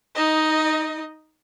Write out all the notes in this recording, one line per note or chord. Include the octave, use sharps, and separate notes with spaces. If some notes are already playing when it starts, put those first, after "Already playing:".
D#4 D#5